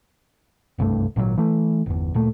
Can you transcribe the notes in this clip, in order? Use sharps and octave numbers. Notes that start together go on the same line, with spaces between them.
F#1 C2 G2 A3
G#1 A#2 D#3 F#3
E3 A3
G1 E2
D1 A#2 A3